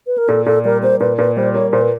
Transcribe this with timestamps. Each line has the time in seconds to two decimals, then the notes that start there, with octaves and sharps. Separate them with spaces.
0.07 B4
0.18 A#4
0.28 A#2 A4
0.46 A#2 A4
0.65 G3 A#4
0.82 A#3 C5
1.00 A#2 B4
1.18 A#2 B4
1.37 G3 C5
1.54 A#3 C#5
1.73 A#2 C5
1.82 B4